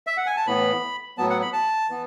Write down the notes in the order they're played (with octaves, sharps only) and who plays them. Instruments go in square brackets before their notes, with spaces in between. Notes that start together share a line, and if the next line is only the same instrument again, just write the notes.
[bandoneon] E5
F#5
G#5
A5
A2 E3 B3 B5
A2 F#3 B3 A5
F#5
B5
A5
E3 B3